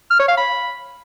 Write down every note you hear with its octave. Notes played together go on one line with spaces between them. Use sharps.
F6
C#5
F5
B5